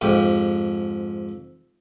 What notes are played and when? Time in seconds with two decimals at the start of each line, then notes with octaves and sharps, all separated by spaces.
0.01 F2 G#2 G4